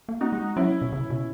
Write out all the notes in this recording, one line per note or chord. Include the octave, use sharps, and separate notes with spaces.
A#3
D#4 F#4
G#3
F#3 C#4 E4
B2
C#3
B2